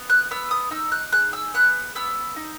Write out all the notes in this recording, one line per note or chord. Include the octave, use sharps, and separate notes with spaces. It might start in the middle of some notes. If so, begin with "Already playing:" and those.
Already playing: B3
F#6
B3 E6
D#6
D#4 E6
F#6
G#4 F#6
E6
B3 F#6
B3 E6
D#4